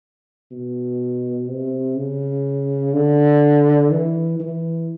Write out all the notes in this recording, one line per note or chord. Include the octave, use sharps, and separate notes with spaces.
B2
C3
C#3
D3
E3
E3